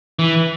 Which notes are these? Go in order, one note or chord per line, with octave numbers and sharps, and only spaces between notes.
E3